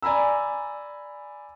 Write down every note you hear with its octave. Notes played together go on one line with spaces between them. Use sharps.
D5 G#5 A#5 B5 E6